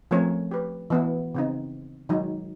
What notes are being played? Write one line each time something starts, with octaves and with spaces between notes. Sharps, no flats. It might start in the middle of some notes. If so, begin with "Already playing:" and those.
F3 A3 C4 C#4 A#4 C#5
G4 B4
E3 B3 E4
C#3 C4 D#4
D#3 F#3 G#3 D#4